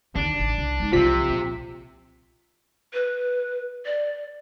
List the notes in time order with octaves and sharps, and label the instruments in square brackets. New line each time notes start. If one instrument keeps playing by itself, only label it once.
[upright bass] D#2 D3 [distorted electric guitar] D4
[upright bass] A1
C2
G#3 D#4
[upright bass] C2 F#3 [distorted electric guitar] C3 [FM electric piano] F3 B6
[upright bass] A#1
[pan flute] B4
D5